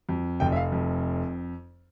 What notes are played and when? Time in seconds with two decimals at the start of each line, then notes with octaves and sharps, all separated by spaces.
0.09 F2
0.40 F1 G5
0.52 E5
0.56 F5
0.72 F2